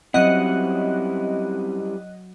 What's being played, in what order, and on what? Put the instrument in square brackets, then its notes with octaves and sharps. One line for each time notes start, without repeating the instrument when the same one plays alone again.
[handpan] F#3 F#5 [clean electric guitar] G3 C#4 E4 [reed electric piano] C4 [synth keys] D#5 F#6